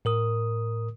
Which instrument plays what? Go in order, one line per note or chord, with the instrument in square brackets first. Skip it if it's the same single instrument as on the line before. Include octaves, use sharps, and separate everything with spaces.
[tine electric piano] A2 A#4 D#6